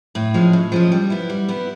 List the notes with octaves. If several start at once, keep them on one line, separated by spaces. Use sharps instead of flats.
A2
F3 G#3 C#4
A2
F3 G#3 C#4
G3
B3 E4
G3
B3 E4